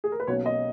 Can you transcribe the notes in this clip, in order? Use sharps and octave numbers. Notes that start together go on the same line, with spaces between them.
G#4
A#4
B4
B1 B2 A#3 C#4 C#5
D#5